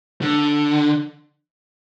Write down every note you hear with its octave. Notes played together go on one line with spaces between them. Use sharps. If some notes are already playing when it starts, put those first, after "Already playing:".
D3